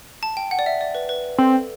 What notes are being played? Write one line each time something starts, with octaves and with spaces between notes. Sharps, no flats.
A5
G5
F#5
D5
E5
D5
B4
B4
B4
C4 A4